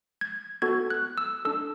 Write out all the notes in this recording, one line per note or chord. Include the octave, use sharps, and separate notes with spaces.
G#6
B3 F#4 A4 G#6
F#6
E6
D4 A4 E6